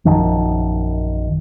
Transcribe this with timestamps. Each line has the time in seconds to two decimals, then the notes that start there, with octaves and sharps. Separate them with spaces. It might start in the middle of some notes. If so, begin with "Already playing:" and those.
0.05 A#1 F#2 D#3 F3